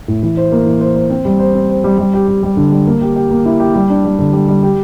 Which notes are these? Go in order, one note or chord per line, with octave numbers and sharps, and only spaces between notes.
A2
E3
C5
A#3
E3
C5
C5
C4
G3
C5
C4
C5
G3
G3
G4
G4
G3
D3
G3
A#3
G4
G4
A#3
E4
G4
G3
D4
G3
D3
G3
G3
G4